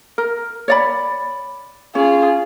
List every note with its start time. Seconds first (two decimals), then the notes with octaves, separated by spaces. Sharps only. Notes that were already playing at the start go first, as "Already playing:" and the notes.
0.18 A#4
0.68 C#5 D5 B5
1.95 C#4 F4 G#4